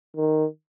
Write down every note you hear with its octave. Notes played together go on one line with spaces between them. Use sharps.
D#3